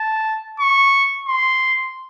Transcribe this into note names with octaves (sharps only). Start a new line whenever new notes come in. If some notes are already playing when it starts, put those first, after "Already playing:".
Already playing: A5
C#6
C6